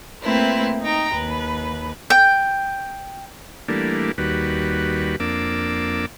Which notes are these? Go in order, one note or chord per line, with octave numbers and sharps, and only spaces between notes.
A3 A#3 C4 E4 B4
D#4 G5 A#5
D#2 B4
G5
E3 G3 A3 A#3 D4
D#2 G3 F#4 B4
F2 A#3 D4 D6 E6